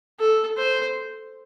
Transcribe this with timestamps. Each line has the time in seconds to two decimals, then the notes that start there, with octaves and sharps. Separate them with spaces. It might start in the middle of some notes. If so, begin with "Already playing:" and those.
0.19 A4
0.57 C5